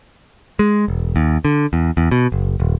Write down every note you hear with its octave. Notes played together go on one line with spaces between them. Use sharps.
G#3
E1
D#2
D3
E2
E2
B2
F#1
D#1